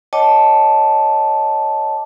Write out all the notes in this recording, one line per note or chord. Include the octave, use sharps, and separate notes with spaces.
C#5 D#5 G5 A5 D6